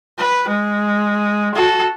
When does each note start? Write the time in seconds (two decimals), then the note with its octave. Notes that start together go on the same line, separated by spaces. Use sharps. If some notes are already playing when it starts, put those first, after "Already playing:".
0.18 B4
0.48 G#3
1.55 F#4 A4